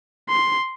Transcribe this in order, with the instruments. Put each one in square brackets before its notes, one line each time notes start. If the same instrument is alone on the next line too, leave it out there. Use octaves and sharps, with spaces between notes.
[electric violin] C6